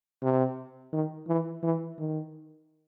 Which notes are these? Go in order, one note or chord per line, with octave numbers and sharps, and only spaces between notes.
C3
D#3
E3
E3
D#3